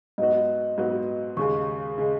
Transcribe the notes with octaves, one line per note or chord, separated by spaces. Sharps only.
G#2 F#3 B3 F#4 D#5
G#2 F#3 B3 F#4
D#2 C#3 G#3 C#6
C#3 G#3